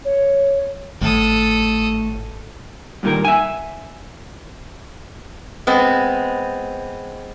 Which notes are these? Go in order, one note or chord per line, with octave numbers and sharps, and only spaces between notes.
C#5
G#1 A2 A4 D#6
G2 A#2 D#3 A#4
E5 G#5
G#3 B3 C4